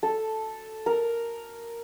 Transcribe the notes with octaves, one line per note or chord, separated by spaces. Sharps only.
A4
A#4